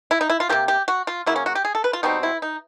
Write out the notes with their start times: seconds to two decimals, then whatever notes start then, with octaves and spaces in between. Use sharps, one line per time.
0.11 E4
0.21 D#4
0.30 E4
0.40 F4
0.49 C3 F3 A#3 G4
0.68 G4
0.88 F#4
1.07 F4
1.26 C#3 F#3 A#3 E4
1.36 C#4
1.46 F#4
1.55 G4
1.65 G#4
1.75 A4
1.84 B4
1.93 F4
2.03 B2 G3 C4 D#4
2.23 E4
2.42 D#4